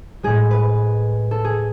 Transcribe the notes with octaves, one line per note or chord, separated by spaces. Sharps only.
A2 G#3 G#4
B4
A4
G#4